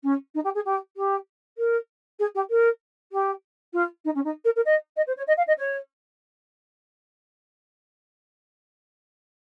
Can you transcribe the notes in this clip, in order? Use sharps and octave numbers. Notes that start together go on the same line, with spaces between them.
C#4
D#4
G4
G#4
G4
G4
A#4
G#4
G4
A#4
G4
F4
D#4
C#4
D#4
A#4
A#4
D#5
D#5
C5
C#5
D#5
F5
D#5
C#5